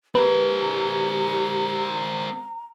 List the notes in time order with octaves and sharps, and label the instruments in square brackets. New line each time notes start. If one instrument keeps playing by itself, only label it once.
[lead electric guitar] C4 A#4 [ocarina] G4 [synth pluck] B4 [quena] A#5